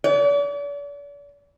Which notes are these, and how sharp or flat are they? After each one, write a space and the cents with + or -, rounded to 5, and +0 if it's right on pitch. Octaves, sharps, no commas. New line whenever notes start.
D5 -40